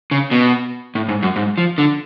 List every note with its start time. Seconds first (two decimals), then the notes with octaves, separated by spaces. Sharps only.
0.11 C#3
0.31 B2
0.95 A2
1.09 G#2
1.22 F#2
1.36 G#2
1.58 F3
1.78 D3